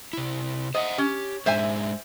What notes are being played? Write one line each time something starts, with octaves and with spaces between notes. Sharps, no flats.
C3 E4
C5 D#5 E5 F#5
C#4 G4
G#2 G#3 D4 C5 E5 G#5